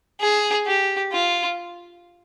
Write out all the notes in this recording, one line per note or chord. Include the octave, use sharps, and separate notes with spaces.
G#4
G4
F4